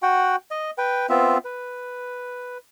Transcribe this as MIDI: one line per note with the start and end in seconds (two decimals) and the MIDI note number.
0.03 0.36 66
0.03 0.36 78
0.03 0.36 79
0.51 0.71 75
0.78 1.06 71
0.78 1.06 79
1.09 1.38 59
1.09 1.38 60
1.09 1.38 65
1.09 1.38 76
1.45 2.58 71